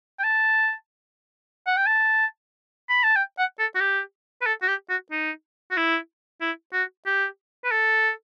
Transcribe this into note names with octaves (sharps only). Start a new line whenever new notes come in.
G5
A5
F#5
G5
A5
B5
A5
G5
F#5
A4
F#4
G4
B4
A4
F#4
G4
F#4
D#4
F#4
E4
E4
F#4
G4
B4
A4